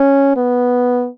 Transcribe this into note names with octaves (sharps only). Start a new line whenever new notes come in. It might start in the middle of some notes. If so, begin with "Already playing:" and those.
Already playing: C#4
B3